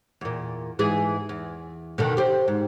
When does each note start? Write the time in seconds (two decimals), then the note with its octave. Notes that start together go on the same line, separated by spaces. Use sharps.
0.21 E2 A#2
0.79 G#2 E3 G#4
1.29 E2
1.98 B2 D3 D#3
2.17 G4 C5
2.48 G#2